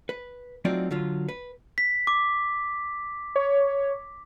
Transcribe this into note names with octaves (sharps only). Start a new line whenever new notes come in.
B4
F#3 A3 C4 D#4 F4 D5
D3 F#3 F4
B4
B6
D6
C#5